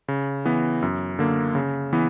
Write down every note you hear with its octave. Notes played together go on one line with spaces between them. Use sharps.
C#3
E3 B3
F#2
D3 A#3
C#3
E3 B3